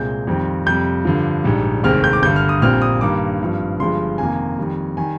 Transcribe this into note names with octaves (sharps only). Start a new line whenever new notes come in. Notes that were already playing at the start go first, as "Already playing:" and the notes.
Already playing: C2 A#2 G#3 C4 G6
F2 D#3 G3 C4
F2 C3 G3 G6
G2 D3 F3
A#1 G#2 G3
F1 D#2 D#3 G#3 C4 F6
G6
D6
G1 G2 D3 G6
F6
D#6
A#1 A#2 G3 C4 F6
D#6
G2 D#3 G3 A#3 D6
G#1 G2 F3
G1 G2 F3 G#3 C6
F2 C3 D#3 A#3 G#5
F2 D#3 G3
D#3 G3 G#5